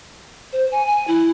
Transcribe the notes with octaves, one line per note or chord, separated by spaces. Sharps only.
C5
G#5
G#5
E4